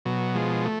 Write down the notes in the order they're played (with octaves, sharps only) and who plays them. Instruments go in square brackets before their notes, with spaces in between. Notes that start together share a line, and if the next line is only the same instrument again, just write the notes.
[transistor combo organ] B2 F#3
F3 G#3
A3